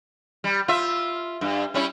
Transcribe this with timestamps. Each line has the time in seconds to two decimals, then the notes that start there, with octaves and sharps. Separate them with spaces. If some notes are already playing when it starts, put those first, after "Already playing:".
0.44 G3
0.68 F4 E5
1.41 G2
1.74 G3 C#4 E4